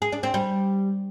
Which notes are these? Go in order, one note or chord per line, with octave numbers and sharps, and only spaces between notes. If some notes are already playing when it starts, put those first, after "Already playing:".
G#4
D4
C4
G3